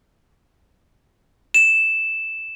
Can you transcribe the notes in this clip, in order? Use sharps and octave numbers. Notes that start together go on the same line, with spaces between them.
E7